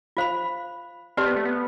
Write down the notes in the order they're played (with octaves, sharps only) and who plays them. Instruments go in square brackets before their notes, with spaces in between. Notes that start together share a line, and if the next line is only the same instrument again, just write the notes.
[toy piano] F4 C5 F5 B5
[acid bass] C4 [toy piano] G4 B4 D5 A5 C6
[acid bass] B3
A3
B3